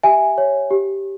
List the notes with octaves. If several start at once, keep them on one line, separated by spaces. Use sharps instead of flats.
G4 E5 G#5
C#5
G4